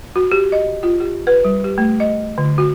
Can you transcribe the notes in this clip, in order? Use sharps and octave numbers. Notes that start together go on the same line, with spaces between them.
F#4
G4
D#5
F4
G4
B4
G3
G4
A3
D#5
D3
F#4